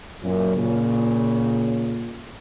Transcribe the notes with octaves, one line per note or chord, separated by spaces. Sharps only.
F#2 A#2
A#2 C#3